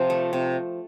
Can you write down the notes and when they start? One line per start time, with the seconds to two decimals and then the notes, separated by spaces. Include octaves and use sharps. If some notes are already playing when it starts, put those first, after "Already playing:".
Already playing: C3 F3
0.10 A3
0.33 C3